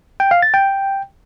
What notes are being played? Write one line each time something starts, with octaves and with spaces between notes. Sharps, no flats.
G5
F5
A6
G5